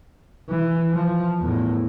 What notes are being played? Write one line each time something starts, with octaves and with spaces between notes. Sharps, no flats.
E3
F3
E2 A2